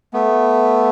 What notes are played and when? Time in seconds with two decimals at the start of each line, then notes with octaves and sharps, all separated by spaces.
0.13 A3 B3